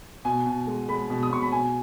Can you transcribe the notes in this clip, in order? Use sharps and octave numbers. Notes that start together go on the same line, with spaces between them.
B2 G#5
B2
G#3
G#3 B5
B2
D#6
B2 C#6
B5
B2 G#5